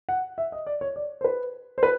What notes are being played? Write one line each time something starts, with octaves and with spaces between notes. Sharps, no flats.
F#5
E5
D#5
D5
C#5
D5
C5
B4
C5
B4